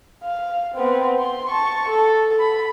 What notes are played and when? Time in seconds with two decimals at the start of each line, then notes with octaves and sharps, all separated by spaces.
0.23 F5
0.75 B3 C4
1.19 C6
1.49 A5 C#6
1.89 A4
2.39 B5